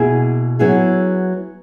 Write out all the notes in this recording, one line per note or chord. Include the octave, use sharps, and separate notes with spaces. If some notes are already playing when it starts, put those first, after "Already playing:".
Already playing: B2 A#3 E4 G#4
F#3 B3 E4 G#4